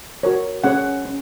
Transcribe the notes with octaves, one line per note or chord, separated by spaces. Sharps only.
F#4 A#4 C#5
C#4 G#4 C#5 F#5
C#4